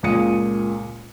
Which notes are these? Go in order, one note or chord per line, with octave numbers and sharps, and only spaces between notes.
C#2 A#2 D#6 C#7 D#7